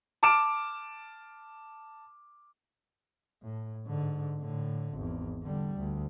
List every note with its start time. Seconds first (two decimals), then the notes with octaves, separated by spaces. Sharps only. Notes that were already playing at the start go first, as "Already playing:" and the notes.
0.23 A5 D6 F6 D7 E7
3.42 A2
3.86 G#2 D3
4.39 A2 D3
4.95 G#1 E2
5.42 D3 G3
5.79 D2